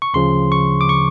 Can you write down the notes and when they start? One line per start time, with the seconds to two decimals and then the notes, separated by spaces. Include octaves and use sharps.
0.02 C#6
0.14 D2 C#3 F3 C6
0.52 C#6
0.81 D6
0.89 C#6